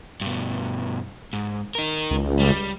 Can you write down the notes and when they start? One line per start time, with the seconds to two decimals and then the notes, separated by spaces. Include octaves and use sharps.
0.21 G2 B2
1.33 G#2
1.75 D#4 A#4
2.11 C#2
2.40 G3